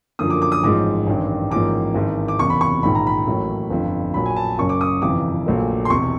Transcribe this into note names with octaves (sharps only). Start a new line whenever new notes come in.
F#2 D3 F3 A#3 D#6
D6
D6
D#6
A1 G#2 F3 G#3 D6
A1 G2 D#3
A1 G#2 F3 A#3 D6
G#1 G#2 E3
D6
F#1 E2 C3 C#6
B5
C#6
A#1 G#2 D#3 B5
A#5
B5
A1 A2 F#3 A#3
G1 F2 D3
A#1 A#2 F#3 B5
G#5
A5
F#1 F#2 C#3 F#3 C#6
D6
D#6
G1 F2 C3 E3 D6
A#1 A#2 F#3 A3
C6
E1 E2 C3 C#6